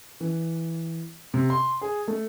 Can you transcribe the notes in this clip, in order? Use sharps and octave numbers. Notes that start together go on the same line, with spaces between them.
E3
C3
C6
G#4
A3